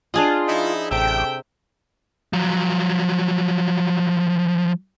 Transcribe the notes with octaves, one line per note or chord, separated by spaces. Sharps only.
D4 F4 G#4 D#5
F3 D#4 E4
A1 C3 A4 E5 G5
F3 F#3